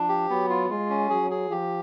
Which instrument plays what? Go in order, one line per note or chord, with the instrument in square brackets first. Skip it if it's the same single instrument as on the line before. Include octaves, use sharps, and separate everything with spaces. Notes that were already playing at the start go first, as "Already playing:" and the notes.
Already playing: [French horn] F3 [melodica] D4
[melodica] G4
[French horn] F#3 [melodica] B3
[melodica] F4
[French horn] G#3 [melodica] F4
[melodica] C#4
[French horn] F#3 [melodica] G#4
[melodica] G#4
[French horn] F3 [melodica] G4